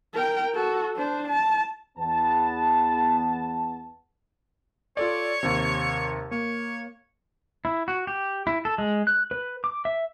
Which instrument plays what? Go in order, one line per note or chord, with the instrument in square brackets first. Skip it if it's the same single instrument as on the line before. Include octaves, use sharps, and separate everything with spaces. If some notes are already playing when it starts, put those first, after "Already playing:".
[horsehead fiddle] A#4 G5
F#4 A4
D4 C5
A5
[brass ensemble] E2 B3 A5
[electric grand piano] F4 A4 D5 [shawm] C#5
[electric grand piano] D#2 C3
[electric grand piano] A#3 [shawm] C#5
[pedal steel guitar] E4
F#4
G4
E4
A4
G#3
F#6
B4
D6
E5